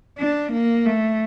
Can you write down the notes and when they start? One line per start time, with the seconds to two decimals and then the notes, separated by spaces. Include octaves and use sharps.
0.19 D4
0.53 A#3
0.86 A3